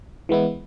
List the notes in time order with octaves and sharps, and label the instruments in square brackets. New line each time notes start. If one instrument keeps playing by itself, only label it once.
[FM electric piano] E3 G#3 B3 E4